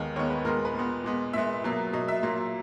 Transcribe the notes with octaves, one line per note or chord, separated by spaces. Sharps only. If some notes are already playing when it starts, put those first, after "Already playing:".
Already playing: D#2 D#3 G#3 B3
D#2 D#3 G#3 B3 C#5
B4
A#2 G#3 B3 A#4
B4
A#2 G#3 B3
A#2 G#3 B3
A#2 G#3 B3 E5
B2 F#3 A#3
B2 F#3 A#3 D#5
E5
A#2 F#3 A#3